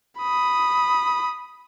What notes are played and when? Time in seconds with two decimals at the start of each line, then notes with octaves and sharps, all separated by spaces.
0.18 B5 D#6